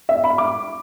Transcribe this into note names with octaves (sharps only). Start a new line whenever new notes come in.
E5
B5
D6